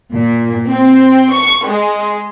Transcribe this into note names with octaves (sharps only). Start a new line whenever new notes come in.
A#2
C4
C#6
G#3